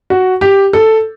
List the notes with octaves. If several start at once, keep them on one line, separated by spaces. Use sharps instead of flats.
F#4
G4
A4